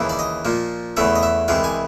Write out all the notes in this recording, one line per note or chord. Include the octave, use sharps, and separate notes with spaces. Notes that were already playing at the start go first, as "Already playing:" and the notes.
Already playing: D#2 C#3 E3
D5
D#5
A#2 F3 A#3
E2 C#3 E3 A3 E5
D#5
E5
C2 C3 E3 G#3 F5
G#5